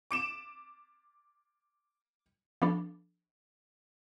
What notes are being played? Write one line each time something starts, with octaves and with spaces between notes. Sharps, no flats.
D6 D7 E7
F3 B3 D4 A4